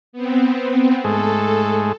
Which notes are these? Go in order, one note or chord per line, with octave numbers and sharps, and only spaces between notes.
B3 C4
G#2 G#3 A3 A4